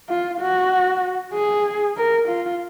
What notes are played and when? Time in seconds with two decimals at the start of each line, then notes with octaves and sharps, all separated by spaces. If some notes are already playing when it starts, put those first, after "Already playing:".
0.09 F4
0.40 F#4
1.34 G#4
1.97 A#4
2.28 F4